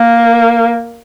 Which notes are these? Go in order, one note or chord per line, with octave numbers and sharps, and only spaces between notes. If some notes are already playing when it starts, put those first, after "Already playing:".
Already playing: A#3